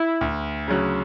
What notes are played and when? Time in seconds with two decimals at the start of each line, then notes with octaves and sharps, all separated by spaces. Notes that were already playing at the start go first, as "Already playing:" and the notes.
Already playing: E4
0.21 D2
0.68 C#3 F#3